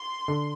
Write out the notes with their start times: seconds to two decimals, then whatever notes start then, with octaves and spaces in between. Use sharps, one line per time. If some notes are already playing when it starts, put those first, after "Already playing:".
Already playing: C6
0.28 D3